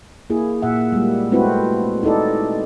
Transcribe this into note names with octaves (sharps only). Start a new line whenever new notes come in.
A#3 E4 G#4
A#2 E5 F#5
G3 G#3 A#3
G#3 A3 C4 E4 F#4 B4
D#4 E4 A4 D5